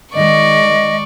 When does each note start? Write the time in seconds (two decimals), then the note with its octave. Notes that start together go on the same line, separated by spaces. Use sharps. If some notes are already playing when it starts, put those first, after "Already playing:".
0.15 D#3 G#3 D5 D#5 C#6